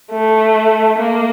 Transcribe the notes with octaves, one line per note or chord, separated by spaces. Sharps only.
A3
A#3